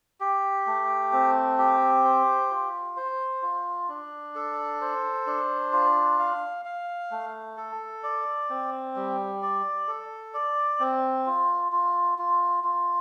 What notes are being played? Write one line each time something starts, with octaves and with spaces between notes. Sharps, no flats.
G4
A3
C4
G4
C5
F4
C5
F4
D4
A4
C5
D4
F4
F5
F5
A3
A4
D5
C4
G3
D5
A4
D5
C4
F4
F4
F4
F4